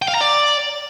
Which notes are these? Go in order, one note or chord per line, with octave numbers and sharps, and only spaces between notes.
G5
F5
A#5
D5